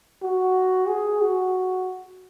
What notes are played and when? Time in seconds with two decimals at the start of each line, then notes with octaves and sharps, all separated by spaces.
0.22 F#4
0.88 G#4
1.21 F#4